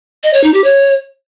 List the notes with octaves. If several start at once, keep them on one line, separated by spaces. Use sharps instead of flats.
D#5
C#5
D#4
G4
C#5